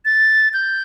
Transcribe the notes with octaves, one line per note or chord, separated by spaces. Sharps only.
A6
G6